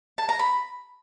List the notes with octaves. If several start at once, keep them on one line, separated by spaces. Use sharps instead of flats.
A5
A#5
B5